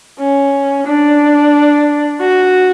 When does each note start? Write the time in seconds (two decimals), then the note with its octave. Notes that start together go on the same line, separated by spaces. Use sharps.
0.20 C#4
0.87 D4
2.21 F#4